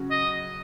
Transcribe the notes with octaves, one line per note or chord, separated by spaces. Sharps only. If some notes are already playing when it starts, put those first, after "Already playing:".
Already playing: C#3 F#3 C#4 F#4
D#5